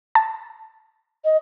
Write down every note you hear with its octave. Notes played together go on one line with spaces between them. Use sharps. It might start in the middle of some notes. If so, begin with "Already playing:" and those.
A5
D#5